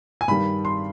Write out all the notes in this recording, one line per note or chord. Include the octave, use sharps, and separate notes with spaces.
G#5
G2 D#3 G3 B5
C6